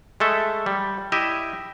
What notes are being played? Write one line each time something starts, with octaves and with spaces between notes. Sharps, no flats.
G#3 A3 A4 E5
G3
E4 G4 D#5 E5